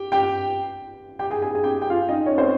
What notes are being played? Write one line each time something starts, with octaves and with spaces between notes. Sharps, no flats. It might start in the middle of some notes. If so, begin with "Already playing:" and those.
Already playing: G4 G5
G4 G5
G4 G5
G#4 G#5
G#4 G#5
G#4 G#5
G4 G5
G4 G5
F4 F5
D#4 D#5
C#4 C#5
C4 C5